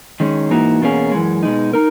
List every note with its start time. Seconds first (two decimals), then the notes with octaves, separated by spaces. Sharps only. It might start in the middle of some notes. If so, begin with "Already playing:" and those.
0.20 D#3 G#3 C#4
0.50 G#2 E3 A#3 D#4 F#4
0.81 E2 B2 A#3 C#4 G#4
1.12 F#2 E3 G#3
1.43 B2 G#3 D#4
1.73 D#4 A#4